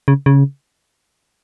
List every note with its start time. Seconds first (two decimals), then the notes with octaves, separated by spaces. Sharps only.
0.08 C#3
0.26 C#3